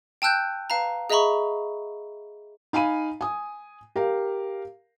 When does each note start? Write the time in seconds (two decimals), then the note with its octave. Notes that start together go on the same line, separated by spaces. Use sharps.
0.22 G5 A5 E6 F#6 G6
0.70 B4 F5 A5 A#5
1.10 G#4 D#5 E5 A#5 B5 C#6
2.73 D#4 F5 G#5 B5 D#7
3.21 G#5 D#6
3.96 G4 A#4 F5